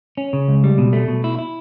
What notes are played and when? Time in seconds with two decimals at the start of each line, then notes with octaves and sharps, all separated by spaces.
0.17 C#4
0.33 C#3
0.48 C#2
0.64 G3
0.78 B2
0.93 A3
1.08 B2
1.24 E4
1.39 E4